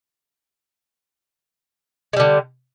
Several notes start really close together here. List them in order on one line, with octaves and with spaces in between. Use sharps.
G#3 G3 D3